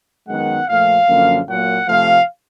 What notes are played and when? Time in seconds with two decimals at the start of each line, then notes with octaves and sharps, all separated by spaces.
0.28 F#2 D#3 G#3 B3 F#5
0.68 A#2 F3 A3 F5
1.08 F#2 D3 F3 A#3
1.48 A#2 F#3 A#3 F#5
1.88 C3 F3 A3 F5